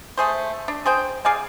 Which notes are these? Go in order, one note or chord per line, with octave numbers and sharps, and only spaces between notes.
A3 G#4 C5
D4
G#4 C5 G5
G#4 D5 F5 G#5